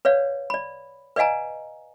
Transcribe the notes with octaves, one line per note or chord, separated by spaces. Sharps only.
B4 C#5 D5 F5
D5 B5
B4 D5 D#5 F5 G#5 A#5